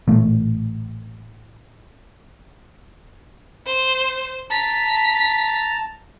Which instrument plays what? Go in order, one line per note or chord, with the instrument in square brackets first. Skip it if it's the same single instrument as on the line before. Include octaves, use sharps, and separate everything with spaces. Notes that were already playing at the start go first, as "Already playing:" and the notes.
[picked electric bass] A1 A#2 A3
[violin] C5
[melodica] A5 A#5 [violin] B6